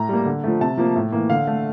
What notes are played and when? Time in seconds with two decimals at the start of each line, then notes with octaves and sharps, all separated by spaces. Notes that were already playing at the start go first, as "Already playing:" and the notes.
Already playing: A2 A#5
0.09 G3 A#3
0.26 D3
0.44 F3 A3
0.61 C3 A5
0.78 F3 A#3
0.96 A2
1.12 E3 A#3
1.30 D3 F5
1.47 A3